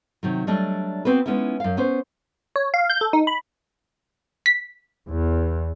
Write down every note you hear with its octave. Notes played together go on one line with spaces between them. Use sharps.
C3 D#3 F#3
F#3 G3 A3 D4 D#5
B3 C4 F#4 B4
G#3 B3 C#4 D#4 E4
F#2 F5
B3 C#4 C5
C#5
F5
G6
A4
D#4
B5
B6
E2